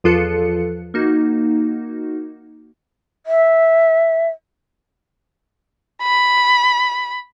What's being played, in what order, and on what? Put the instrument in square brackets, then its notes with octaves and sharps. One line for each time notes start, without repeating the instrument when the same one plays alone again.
[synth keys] E2 F3 F4 A4 F#6 C#7
A#3 D#4 F#4
[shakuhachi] E5
[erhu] B5